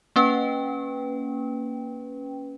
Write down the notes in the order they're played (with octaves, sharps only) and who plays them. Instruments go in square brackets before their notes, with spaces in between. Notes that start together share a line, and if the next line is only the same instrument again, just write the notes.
[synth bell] A#3 C#4 B4 G5